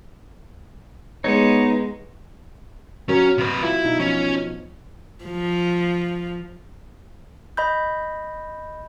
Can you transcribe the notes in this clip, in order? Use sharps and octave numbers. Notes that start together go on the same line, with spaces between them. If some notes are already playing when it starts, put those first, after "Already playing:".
G#3 B3 D#4 C#5
F#3 C#4 F#4 A#4
C3 B4
E4 F4
B2 D#4
F3 C#4
F3
D#5 B5 G6